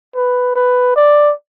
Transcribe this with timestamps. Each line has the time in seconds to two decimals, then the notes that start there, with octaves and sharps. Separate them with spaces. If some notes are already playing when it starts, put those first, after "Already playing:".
0.16 B4
0.56 B4
0.96 D5